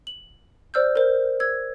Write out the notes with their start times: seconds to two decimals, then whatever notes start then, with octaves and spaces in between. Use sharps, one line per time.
0.07 F#7
0.74 C5 D5 E6 F6 G6
0.96 A#4 C5
1.40 E6 G#6